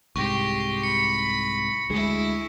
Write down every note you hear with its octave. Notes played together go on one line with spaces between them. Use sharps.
C2 G#2 G4 C6 C#6 A#6
B5 C#7
D2 G#3 E4 G#4